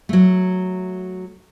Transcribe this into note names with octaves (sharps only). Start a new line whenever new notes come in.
F#3 A3